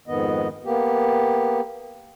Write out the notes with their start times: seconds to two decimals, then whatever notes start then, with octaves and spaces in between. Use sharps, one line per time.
0.08 F2 G#2 D#3 B3 D#5
0.65 A#3 B3 G4